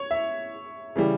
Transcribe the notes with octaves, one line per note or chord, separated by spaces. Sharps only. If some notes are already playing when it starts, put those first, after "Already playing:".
Already playing: C#5
E5
C#3 E3 G3